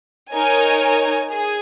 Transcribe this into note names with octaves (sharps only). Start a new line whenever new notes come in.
D#4 A#4 C#5 G#5
G#4